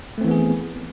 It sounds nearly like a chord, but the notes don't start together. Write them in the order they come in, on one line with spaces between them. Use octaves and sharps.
A3 C4 E3 B3 G#4